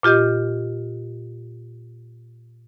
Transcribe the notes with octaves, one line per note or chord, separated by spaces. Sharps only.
A#2 F4 G4 D#5 G6